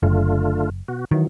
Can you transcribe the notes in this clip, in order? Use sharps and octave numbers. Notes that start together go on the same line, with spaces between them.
F#1 D3 A3 F4
B2 F#4
D#3 E3 F#3